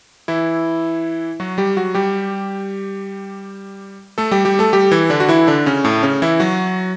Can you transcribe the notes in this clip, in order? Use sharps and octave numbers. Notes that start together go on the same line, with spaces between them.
E3 E4
F#3 F#4
G3 G4
F#3 F#4
G3 G4
A3 A4
G3 G4
G3 G4
A3 A4
G3 G4
E3 E4
D3 D4
F#4
E3 E4
D3 D4
C#3 C#4
A2 A3
C#3 C#4
E3 E4
F#3 F#4